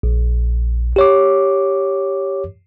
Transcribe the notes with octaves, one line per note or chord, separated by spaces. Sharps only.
A#1
G4 C#5 D6